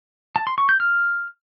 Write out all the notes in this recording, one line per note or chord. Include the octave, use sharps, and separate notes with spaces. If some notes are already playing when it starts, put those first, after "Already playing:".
A5
C6
C#6
G6
F6